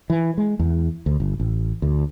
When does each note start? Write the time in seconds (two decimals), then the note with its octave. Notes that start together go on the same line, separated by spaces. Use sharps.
0.10 E3
0.38 G#3
0.59 E2
1.06 D2
1.20 G1
1.40 A1
1.82 D2